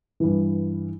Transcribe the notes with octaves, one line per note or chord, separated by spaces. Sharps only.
G2 E3